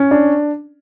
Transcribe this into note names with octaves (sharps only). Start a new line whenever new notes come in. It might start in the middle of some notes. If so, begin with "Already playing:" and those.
Already playing: C#4
D4